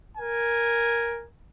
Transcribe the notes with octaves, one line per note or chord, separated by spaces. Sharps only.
A#4 G#5